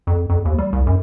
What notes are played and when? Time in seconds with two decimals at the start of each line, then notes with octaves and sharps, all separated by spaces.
0.07 F2
0.30 F2
0.45 D#2
0.58 G3
0.73 C2
0.87 F#2